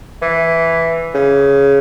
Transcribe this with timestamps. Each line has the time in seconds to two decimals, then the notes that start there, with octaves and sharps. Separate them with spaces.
0.22 E3
1.15 C#3